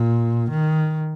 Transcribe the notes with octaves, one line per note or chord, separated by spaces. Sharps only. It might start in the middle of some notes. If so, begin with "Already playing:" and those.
Already playing: A#2
D#3